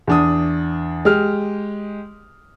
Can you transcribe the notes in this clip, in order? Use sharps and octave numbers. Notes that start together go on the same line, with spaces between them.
E2 D4 D#6
G#3 G4 F6